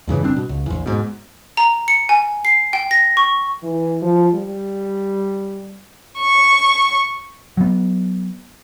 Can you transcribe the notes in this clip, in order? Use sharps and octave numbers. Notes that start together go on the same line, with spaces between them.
E2 G2 C#3 E3
F#1 G3 C4 D4
B2
C#2
A#1 E2
G#2 B2
A#5
C#7
G#5
C7
G5
A#6
C#6
E3
F3
G3
C#6
F#3 B3